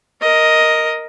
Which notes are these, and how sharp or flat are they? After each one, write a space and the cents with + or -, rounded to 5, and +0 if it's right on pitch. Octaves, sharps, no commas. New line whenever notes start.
A#4 +0 D#5 +5